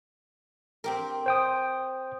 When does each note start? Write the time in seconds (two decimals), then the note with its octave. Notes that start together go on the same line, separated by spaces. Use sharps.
0.84 C4 G4 A#4
1.26 C5 G5 D#6